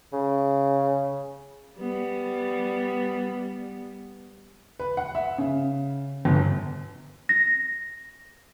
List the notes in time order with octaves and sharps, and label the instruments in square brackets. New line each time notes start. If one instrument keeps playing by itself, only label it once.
[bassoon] C#3
[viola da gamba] G3 B3
[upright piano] B4
F#5
E5
C#3
G1
[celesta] A#6